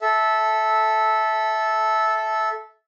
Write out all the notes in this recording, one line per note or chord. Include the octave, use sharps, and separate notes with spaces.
A4 E5